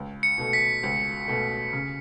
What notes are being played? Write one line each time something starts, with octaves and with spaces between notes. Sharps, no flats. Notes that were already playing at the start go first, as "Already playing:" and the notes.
Already playing: C#2
C#7
B2 A3
B6
C#2
B2 A3
C#3